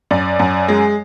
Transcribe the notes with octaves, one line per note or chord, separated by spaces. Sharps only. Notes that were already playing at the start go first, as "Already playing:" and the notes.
F#2 D5
F#2
G#3